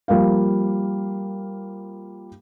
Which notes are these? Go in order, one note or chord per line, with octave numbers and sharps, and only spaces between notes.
F3 G3 A#3 F5